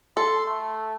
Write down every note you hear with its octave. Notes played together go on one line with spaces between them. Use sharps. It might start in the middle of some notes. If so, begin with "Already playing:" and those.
A4 C6
A3